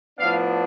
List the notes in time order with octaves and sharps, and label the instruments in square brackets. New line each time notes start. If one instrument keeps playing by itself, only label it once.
[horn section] A2 F3 B3 D4 F5